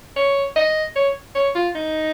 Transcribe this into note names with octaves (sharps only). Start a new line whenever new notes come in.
C#5
D#5
C#5
C#5
F4
D#4